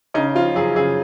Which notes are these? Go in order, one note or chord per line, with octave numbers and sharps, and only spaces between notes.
C#3 D#4
F3 F4
F#2 G#4
C#3 G#4